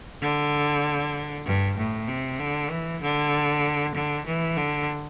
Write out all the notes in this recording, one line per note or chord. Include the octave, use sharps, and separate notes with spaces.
D3
G2
A2
C3
D3
E3
D3
D3
E3
D3